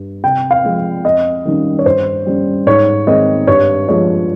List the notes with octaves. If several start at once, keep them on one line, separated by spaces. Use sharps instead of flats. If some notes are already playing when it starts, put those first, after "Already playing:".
Already playing: G2
C3 G5
F5
F3 G#3
F2 D#5
D#3 G3 C#4
C#5
G2 C5
G3 C#4
G#2 C#5
D#3 G#3 C4 D#5
G2 C#5
F3 G#3 C#5